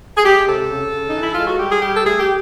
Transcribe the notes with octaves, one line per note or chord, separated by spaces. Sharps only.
G#4
G#3 G4
C3 A4
C#3
C#3
D#4
E3
E4
G#3 F4
F#4
G3 G4
G#4
G3 G4
A4
A3 G#4
G4